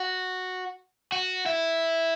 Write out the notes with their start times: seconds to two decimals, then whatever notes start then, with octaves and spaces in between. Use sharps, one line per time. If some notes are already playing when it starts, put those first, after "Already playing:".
Already playing: F#4
1.12 F#4
1.46 E4